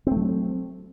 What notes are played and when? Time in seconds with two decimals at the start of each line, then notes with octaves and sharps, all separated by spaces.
0.07 C4
0.11 A3
0.16 F#3